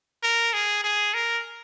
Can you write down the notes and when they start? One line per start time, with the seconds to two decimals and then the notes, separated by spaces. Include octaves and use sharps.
0.23 A#4
0.53 G#4
0.84 G#4
1.14 A#4